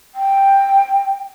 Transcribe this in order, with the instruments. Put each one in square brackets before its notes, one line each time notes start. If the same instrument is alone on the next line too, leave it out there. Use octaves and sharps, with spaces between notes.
[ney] G5